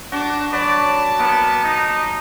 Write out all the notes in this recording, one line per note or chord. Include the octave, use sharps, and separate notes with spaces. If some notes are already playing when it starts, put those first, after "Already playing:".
D4 F#4 D6
F#3 B4 D5 A5
A#3 B3 D6
D#4